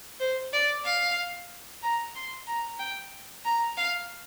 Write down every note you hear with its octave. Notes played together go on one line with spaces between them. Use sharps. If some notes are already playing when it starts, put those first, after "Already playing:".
C5
D5
F5
A#5
C6
A#5
G5
A#5
F5